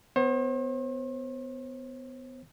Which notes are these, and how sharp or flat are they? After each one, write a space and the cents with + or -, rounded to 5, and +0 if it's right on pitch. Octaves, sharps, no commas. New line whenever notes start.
B3 +25 C5 +45